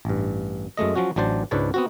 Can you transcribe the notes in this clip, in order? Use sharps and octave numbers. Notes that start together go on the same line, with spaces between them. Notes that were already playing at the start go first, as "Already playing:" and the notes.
A1 G2
F#2 G#3 A3 D#5
F3 F#3 C#4 F#4
A1 F#3 D4 C5 A5
C#2 G#2 D4 B4 C#5 A5
B3 C4 F#4